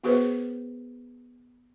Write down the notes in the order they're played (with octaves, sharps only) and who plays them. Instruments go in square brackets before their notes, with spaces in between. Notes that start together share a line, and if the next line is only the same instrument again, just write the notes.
[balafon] B3 F#4 G#4 B4 C5